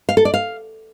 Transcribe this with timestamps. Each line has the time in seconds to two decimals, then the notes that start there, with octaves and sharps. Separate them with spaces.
0.09 F5
0.17 A4
0.25 D5
0.34 F5